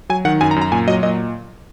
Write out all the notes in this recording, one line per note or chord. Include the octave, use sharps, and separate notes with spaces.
F#3 G#5
D#3 F#5
F#2 G#5
A#5
F#2
A#5
A#2 G#5
F#3 D#5
A#2 D#5